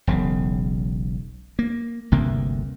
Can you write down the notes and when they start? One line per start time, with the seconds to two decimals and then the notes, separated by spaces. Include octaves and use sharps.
0.07 E1 B1 C#3
1.59 A#3
2.12 G1 D2 C3 A#3